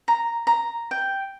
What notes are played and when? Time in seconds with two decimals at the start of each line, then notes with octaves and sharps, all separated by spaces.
0.08 A#5
0.47 A#5
0.91 G5